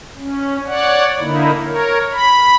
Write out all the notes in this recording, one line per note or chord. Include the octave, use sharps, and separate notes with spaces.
C#4
C#5 D5 F#5
D3 A#3 D#4 E4
A#4 C#5
B5